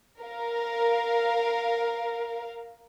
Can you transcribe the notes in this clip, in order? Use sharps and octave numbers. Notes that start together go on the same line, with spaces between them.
A#4 F5